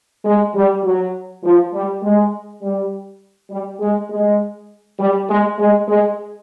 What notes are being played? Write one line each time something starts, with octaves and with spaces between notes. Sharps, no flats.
G#3
G3
F#3
F3
G3
G#3
G3
G3
G#3
G#3
G3
G#3
G#3
G#3